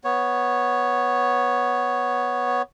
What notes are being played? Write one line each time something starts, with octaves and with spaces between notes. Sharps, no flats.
B3 C#5